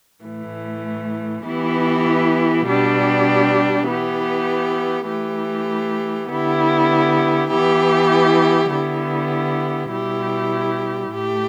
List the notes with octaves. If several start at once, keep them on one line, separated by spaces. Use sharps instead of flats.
A2 E3 A3
E3 B3 E4 G4
B2 G3 D4 G4
E3 B3 G4
E3 A3 G4
D3 B3 E4 G4
E3 B3 E4 G4
D3 B3 E4 G4
B2 G3 E4 G4
A2 A3 G4